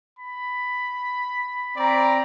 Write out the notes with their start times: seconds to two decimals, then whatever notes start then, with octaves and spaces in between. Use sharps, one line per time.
0.19 B5
1.77 C4 D5 A#5